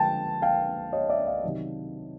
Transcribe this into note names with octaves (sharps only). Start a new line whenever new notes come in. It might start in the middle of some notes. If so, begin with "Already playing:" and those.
Already playing: D3 F3 G#3 G5 A5
F5 G5
C#5 D#5
D5 E5
D#5 F5
C3 D#3 F#3